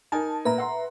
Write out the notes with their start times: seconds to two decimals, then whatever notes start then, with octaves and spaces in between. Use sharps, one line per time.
0.12 D#4 A#4 G#5 A5
0.45 A#2 B4 E5 A#5
0.58 F#5 C6